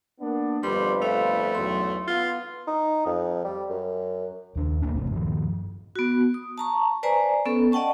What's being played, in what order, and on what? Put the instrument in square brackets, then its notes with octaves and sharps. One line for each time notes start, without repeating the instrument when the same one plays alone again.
[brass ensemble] A#3 B3 D4
[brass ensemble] G1 F2 B4 [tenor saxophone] G3 [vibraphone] C6
[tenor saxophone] A3 [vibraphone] F5
[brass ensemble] B1 E2 [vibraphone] C6
[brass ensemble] B3 F5 [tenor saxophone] F4
[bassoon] D#4
F2
G3
F#2
[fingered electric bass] D#2 D4
D#2 A#3 C#4 D4
D1 G1 C3 A3
G2 D#3 F3
[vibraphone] B3 F#4
D#6
A5 A#5 C#6
B4 C5 D5 G#5 A#5
B3 C#4 A4
D5 D#5 F#5 G5 A5 C#6